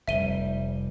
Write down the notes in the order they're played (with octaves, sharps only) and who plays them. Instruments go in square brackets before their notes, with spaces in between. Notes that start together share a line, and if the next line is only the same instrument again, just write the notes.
[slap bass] F1 F2 G3 [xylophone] E5 D#7 G7